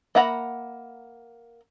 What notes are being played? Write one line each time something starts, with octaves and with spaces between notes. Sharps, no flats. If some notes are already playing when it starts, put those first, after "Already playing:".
A#3 E5 F#5 A#5 B5